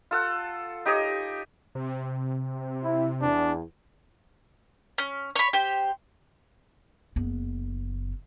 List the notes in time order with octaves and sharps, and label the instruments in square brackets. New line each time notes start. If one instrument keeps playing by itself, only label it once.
[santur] F4 A4 F#5
D#4 G4 C#5 D#5
[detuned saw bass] C3
[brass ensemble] E4
[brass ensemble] E2 [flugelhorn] D4
[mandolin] C#4
C#5 B5
G4 C5
[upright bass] F#1 B3